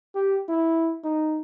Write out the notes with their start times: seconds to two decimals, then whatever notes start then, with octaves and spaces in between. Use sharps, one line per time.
0.15 G4
0.49 E4
1.04 D#4